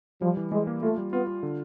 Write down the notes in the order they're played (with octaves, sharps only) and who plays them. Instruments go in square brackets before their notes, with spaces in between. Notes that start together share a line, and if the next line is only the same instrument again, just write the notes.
[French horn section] F3 [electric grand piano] G3
[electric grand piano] E3
[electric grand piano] E3 [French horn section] G#3
[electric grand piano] A#3
[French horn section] A3 [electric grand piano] F4
[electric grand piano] G3
[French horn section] B3 [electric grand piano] F4
[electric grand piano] F4
D3